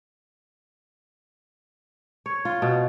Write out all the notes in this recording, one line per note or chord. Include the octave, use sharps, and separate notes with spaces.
C#5
F4
B2